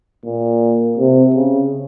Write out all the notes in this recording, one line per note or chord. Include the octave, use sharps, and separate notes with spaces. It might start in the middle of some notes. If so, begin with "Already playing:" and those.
A#2
C3
C#3